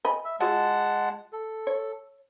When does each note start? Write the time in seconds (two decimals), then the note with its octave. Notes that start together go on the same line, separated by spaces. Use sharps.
0.05 D#5 G#5 B5
0.25 E5
0.40 G#3 F4 F#4 G#4 F#5 A5
1.33 A4
1.67 C#5